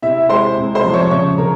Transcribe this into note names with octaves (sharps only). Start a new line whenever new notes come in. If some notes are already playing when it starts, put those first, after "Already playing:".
C3 E4 E5
G#3 C5 C6
C3
C5 C6
F3
C#5 C#6
C#3 C#5 C#6
C#3 A#4 A#5